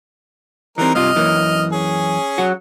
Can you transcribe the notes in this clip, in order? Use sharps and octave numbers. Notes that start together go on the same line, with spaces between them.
E3 G3 C4 D#4 A#4
G2 C3 F4 D#5 F6
F#2 E3 A#3
C#4 G#4
F#3 F#4